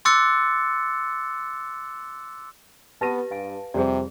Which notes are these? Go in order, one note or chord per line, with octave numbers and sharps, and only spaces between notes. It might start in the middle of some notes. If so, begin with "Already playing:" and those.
C6 D6 E6 F#6 A6 C#7
B3 G4 B4 A5 A#6 D#7
G2 F5 G#5
F2 C3 G3 G#4 C5 D5